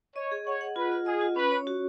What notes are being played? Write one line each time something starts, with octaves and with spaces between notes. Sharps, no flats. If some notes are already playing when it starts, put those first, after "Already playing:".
C#5 D#5
G#4
C#5 F#5
F#5
F4 B4
F4
G#4 D#5
F4
C#4 B4
C#5
F#4